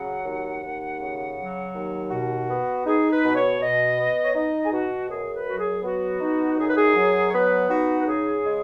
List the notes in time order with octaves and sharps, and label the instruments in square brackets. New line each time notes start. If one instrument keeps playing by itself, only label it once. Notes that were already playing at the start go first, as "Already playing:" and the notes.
Already playing: [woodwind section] C#3 F#3 F#5
D#2
D#2
C#3
F#3
D#2
B2 F#4
B3
D#4 G#4
B4
B2
C#5
B2 D#5
B3
C#5
D#4 D#5
G#4
B2 F#4
F#2 G#4
B4
F#3 F#4
G#4
B3 F#4
D#4
F#2 G#4
B4
G#4
F#3
C#5
B3 B4
D#4 F#4
B4
C#3 G#4
G#3